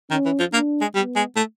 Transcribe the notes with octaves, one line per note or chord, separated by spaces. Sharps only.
D#3 C#4
E3
F3
A#3 D4
G#3
G3 B3
G#3
A3